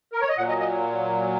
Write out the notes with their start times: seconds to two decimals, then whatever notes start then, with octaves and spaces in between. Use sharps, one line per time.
0.13 A#4
0.21 C#5
0.29 D#5
0.37 A#2 F#3 F#5
0.49 D#5
0.60 D#5